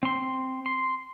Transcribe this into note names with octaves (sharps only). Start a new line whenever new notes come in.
C4 C6
C6